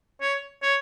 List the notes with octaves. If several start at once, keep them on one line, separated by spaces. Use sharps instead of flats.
C#5
C#5